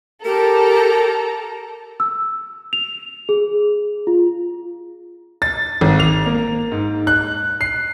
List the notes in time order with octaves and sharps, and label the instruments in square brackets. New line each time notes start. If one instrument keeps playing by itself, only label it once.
[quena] G4 [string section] A4 A#5 [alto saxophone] A#4
[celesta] E6
F7
G#4
F4
[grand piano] A6
G#1
F7
A#3
G#2
F#6
C7